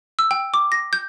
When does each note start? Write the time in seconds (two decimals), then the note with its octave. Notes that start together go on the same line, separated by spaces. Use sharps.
0.19 E6
0.31 G5
0.54 D6
0.72 A#6
0.93 G6